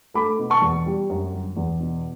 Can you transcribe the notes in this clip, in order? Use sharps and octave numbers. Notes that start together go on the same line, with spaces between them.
A3 B5 D6
B2
A5 C#6
E2
G3
F#2
G1
E2
B2